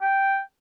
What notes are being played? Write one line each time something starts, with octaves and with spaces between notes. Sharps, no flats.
G5